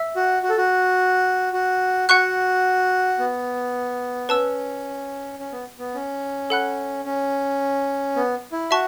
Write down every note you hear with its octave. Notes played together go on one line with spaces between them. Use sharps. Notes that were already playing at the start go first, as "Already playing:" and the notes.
Already playing: E5 E6
F#4
F#4
A4
F#4
F#4
F#4 F#5 C#6 F#6
B3
C#4 B4 A5 E6
C#4
B3
B3
C#4
A4 F#5 B5 F#6
C#4
B3
E4
F#4 E5 A5 C#6